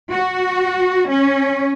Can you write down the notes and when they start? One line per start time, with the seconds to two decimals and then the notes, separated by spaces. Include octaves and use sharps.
0.12 F#4
1.08 C#4